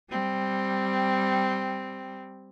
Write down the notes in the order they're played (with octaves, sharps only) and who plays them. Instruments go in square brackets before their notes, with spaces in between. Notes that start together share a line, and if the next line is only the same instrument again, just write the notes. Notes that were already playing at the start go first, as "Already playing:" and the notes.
[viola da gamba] G3 C4